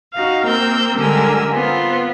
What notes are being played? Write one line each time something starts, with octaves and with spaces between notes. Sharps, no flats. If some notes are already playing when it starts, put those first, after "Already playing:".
D#4 F#4 F5
A#3 C4 A#4 E6 G6
D3 G3 G#3 A#4 G#5 E6
B3 C4 F4